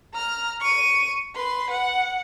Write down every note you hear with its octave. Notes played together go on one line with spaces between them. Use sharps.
A#5 F6
C#6 D#7
B4 C6
F#5